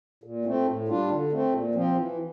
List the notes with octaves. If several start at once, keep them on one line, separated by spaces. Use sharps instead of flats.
A#2
A3 C4
A2
G3 D4 F4
D3
A3 C4
A#2
F3 C4
E3